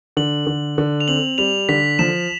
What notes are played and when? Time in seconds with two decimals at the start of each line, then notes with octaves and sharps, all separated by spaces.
0.17 D3 F#7
0.47 D3
0.78 D3
1.00 F7
1.08 C4 F#7
1.38 G3 F7
1.69 D3 B6
1.99 F3 E7